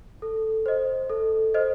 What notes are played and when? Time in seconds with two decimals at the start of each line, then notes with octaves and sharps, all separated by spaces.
0.22 A4
0.66 C5 D#5
1.09 A4
1.54 C5 D#5